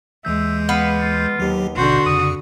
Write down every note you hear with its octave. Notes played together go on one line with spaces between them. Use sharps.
D#2 E3 G#3 E5 G6
B3 F5
F4
D#2 F#3 G4
G#1 B2 D3 F#4 C6 G6
F2 C#3 D#6